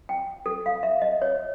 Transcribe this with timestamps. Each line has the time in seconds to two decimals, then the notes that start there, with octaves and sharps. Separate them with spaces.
0.09 G5
0.46 A4
0.66 F5
0.83 E5
1.02 D#5
1.22 C#5